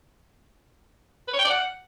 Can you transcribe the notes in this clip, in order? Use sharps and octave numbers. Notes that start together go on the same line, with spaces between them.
B4
C#5
G5
D5
F#5